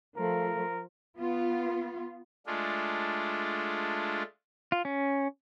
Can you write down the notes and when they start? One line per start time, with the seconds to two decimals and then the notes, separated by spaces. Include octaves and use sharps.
0.17 F3 A3 A#4
1.18 B3 F4
2.47 G#3 A3 D4 F4
4.72 F4
4.85 C#4